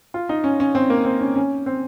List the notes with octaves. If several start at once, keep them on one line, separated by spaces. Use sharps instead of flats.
F4
D#4
C#4
C#4
C4
A#3
C4
C#4
C#4
C4